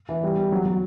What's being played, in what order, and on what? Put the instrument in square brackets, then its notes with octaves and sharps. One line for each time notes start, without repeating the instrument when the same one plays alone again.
[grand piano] E3
G3
G3
F#3
F#3